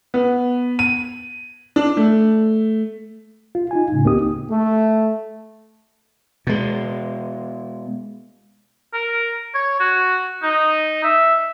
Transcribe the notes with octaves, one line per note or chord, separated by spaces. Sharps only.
B3
D#7
D4
A3
F4
D#4 F4 G#5
A2 C#3
D2 A#3 C4 D#4 G4 D#6
A3
B2 G#3
A#4
C#5
F#4
D#4
E5